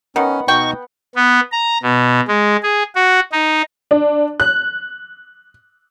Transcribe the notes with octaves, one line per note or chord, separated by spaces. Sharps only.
D#3 B3 C#4 F#5
B2 D#4 F#4 G5 C#6
B3
A#5
B2
G#3
G#4
F#4
D#4
D4
F#6